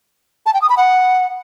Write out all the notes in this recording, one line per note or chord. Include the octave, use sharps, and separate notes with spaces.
A5
G5
D#6
B5
F#5